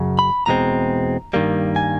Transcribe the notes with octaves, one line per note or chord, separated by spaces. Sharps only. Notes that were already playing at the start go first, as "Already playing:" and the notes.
Already playing: F#2 C#3
B5
E2 B2 G#3 C4 A#5
G2 D#3 G3 A#3
G#5